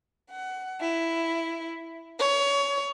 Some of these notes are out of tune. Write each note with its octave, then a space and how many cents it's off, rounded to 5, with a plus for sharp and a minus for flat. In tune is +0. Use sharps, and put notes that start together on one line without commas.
F#5 +20
E4 +5
C#5 +20